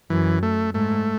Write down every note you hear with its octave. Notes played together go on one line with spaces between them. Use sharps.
F#2 E3
A3
G#2 A3